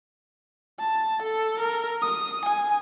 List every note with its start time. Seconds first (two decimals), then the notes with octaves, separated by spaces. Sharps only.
0.79 A5
1.22 A4
1.60 A#4
2.02 D#6
2.46 G#5